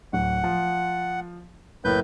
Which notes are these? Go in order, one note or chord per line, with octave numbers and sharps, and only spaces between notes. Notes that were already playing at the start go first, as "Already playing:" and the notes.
D1 F#5
F3
F#1 A2 A#3 E4 B4 G6